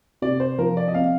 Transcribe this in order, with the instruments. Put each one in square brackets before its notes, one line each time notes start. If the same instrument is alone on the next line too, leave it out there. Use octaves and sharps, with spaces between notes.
[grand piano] C3 [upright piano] D5
[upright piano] C5
[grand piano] F3 [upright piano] A#4
[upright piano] D5
D#5
[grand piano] C4 [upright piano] F5